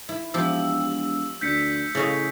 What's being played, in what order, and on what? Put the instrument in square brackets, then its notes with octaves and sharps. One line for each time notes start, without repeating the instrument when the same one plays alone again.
[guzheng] E4
[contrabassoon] E1 [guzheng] F3 G4 [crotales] E6
[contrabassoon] D2 [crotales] G6 B6 C#7
[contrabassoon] A2 [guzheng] C#3 C#4 D#5